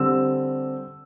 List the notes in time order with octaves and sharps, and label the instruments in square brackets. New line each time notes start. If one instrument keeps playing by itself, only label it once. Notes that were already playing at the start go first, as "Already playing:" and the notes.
Already playing: [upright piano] D3 G3 C4 E6